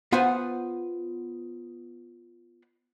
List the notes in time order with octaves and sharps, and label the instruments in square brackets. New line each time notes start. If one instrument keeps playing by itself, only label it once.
[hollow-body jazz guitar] B3 F4 B4 C5 F#5 G#5